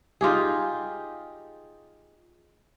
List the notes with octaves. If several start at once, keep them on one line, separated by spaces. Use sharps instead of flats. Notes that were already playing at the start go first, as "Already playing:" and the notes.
D#4 F4 G4 G#4